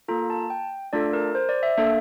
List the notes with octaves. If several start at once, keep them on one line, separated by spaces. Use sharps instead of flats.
A#3 F4 A4 A#5
A5
G5
A3 D4 F4 A4 D5
A#4
C5
D5
E5
A#3 D4 A4 E5